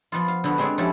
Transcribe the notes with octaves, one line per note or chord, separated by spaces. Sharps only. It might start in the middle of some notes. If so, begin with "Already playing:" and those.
F3 B3 F4
F5
D3 B3 F#4
G#3 C4 F#4 G#4 C#5 D5
F3 C#4 D4 E4 G4 A4